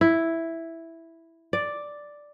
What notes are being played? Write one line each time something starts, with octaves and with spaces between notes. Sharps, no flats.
E4
D5